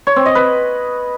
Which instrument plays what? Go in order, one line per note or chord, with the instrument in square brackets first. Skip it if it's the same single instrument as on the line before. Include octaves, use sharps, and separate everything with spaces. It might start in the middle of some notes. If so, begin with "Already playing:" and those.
[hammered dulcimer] C#5
C4
D#5
B4